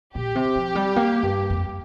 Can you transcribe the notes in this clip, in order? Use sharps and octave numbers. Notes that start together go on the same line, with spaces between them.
A#2 G4
C3
F3
G3
A#3
G2
F2